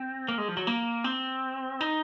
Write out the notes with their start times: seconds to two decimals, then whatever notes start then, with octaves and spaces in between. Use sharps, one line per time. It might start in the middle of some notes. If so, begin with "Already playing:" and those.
Already playing: C4
0.28 A#3
0.38 G#3
0.48 F3
0.57 F#3
0.67 A#3
1.04 C4
1.81 D#4